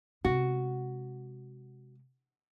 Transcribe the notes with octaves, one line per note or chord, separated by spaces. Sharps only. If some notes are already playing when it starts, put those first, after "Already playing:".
C3 G#3 F#4